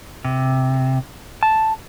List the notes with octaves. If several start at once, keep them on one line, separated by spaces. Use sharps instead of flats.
C3
A5